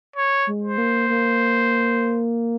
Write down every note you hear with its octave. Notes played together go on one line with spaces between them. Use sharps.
C#5
G#3
C5
A#3
A#3